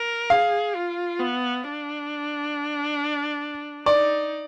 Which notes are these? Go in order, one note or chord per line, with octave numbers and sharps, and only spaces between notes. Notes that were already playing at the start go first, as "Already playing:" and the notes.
Already playing: A#4
G#4 F5
F4
B3
D4
D#4 D5